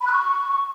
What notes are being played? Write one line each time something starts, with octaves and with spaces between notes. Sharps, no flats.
B5
F#6
C#6